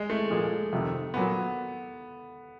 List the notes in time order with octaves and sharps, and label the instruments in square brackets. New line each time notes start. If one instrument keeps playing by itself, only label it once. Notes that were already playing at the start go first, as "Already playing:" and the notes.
Already playing: [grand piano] G#3
A3
[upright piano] A#2 F3 G#3
F2 C3 D#3
[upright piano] A#2 F#3 [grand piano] B3